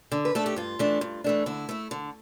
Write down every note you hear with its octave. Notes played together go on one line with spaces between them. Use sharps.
D3
B4
A3 D4 A4
G4
G2 F4
E3 A3 D4
G2
E3 A3 D4
D3 E4
A3 E4
D3